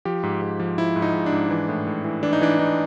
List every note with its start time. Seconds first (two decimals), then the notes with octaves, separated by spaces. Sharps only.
0.05 F3 G4
0.23 G#2
0.42 G#2
0.60 F3
0.78 F3 E4
0.96 G#2
1.02 D#4
1.14 G#2
1.26 D4
1.32 G#2
1.51 E3
1.69 A2
1.87 A2
2.04 E3
2.23 E3 D4
2.33 D#4
2.41 E3 D4
2.59 E3 D#4